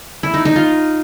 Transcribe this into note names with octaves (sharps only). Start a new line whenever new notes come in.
E4
D#4
D#4
F4